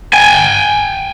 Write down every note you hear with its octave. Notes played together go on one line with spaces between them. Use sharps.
G5 G#5